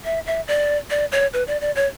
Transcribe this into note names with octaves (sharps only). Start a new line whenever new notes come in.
E5
E5
D5
D5
C#5
B4
D5
D5
C#5